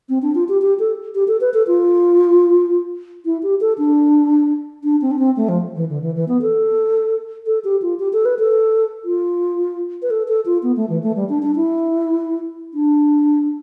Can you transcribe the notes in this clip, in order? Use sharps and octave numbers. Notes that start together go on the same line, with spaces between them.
C4
D4
F4
G4
G4
A4
G4
A4
B4
A4
F4
E4
G4
A4
D4
D4
C4
D4
C4
A3
F3
E3
D3
E3
E3
B3
A4
A4
G4
F4
G4
A4
B4
A4
F4
B4
A4
A4
F4
B3
A3
E3
A3
G3
D4
D4
E4
D4